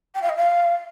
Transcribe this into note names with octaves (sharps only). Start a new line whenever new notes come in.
G5
F5
D#5
F5